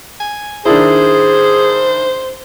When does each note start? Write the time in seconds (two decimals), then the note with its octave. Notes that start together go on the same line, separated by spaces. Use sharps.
0.20 G#5
0.66 D#3 D4 E4 G#4 C5